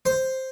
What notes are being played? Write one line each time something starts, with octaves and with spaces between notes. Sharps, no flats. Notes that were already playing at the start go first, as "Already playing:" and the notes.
C5